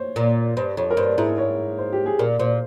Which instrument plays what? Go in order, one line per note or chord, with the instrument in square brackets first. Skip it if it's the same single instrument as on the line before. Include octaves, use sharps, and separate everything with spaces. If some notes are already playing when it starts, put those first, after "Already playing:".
Already playing: [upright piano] C5 C#5
[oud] A#2
[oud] G2 [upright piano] C5
[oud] F2 [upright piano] C#5
[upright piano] A#4
[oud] G2 [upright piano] C5
[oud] G#2 [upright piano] E4
[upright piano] C#5
C5
G4
G#4
[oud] A#2 [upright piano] A#4
[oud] A#2 [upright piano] C5